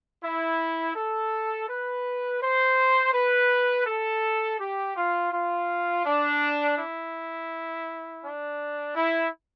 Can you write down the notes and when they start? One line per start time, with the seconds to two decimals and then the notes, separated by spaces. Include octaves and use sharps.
0.22 E4
0.94 A4
1.68 B4
2.40 C5
3.13 B4
3.85 A4
4.58 G4
4.96 F4
5.31 F4
6.05 D4
6.77 E4
8.23 D4
8.96 E4